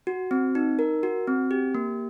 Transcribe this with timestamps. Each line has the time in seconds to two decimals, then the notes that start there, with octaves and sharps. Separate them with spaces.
0.07 F#4
0.31 C4
0.55 D#4
0.79 A#4
1.03 F#4
1.27 C4
1.51 G4
1.75 A#3